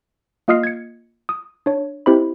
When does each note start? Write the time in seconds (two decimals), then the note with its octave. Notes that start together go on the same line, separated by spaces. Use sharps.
0.48 A#3 F4 D#5 D#6 F6 C7
0.63 G#6 C#7
1.29 D#6
1.66 D4 C#5
2.06 C4 E4 G4 C5 D#5 B5